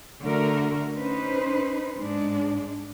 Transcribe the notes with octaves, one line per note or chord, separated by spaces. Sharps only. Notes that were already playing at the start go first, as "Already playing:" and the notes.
D3 A3 F#4 A#4
C#4 D#4 B4 C5
G#2 G#3 D4